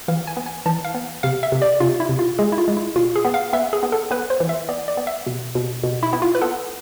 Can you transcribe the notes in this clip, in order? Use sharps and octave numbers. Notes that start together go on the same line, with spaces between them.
E3 F5
G#5
B3
G#5
E3 A5
F5
B3
C3 F5
E5
C3
D5
C3 F4
E4
C3
F4
G#3 G#4
E4
F4
G#3
E4
B2 F4
G#4
B3
F5
B3 E5
G#4
B3
A4
B3 B4
C5
E3
E5
B3 D5
D5
B3
E5
B2
B2
B2
E4
B3 E4
F4
B4
B3 A4